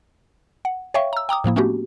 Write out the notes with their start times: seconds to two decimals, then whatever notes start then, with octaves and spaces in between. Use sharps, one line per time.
0.65 F#5
0.94 C#5 E5 F5 G5 C#6
1.13 A#5 E6
1.29 G5 A#5 D6 D#6
1.44 A2 F3 A#3 E4
1.56 A3 B3 C#4 D4 F#4 G4